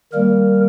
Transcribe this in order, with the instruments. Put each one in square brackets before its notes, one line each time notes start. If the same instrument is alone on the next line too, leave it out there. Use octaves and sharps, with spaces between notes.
[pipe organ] D#3 G3 A#3 A#4